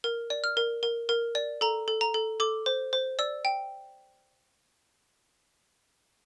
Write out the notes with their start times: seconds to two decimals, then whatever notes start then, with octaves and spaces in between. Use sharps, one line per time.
0.04 A#4
0.30 D5
0.44 F6
0.57 A#4
0.83 A#4
1.09 A#4
1.35 D5
1.61 A4 A#5
1.88 A4
2.01 A#5
2.14 A4
2.40 A4 D6
2.66 C5
2.93 C5
3.19 D5 E6
3.45 G5